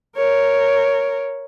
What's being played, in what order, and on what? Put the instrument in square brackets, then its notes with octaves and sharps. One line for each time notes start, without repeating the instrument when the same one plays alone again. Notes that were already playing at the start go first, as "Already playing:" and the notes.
[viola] A#4 C#5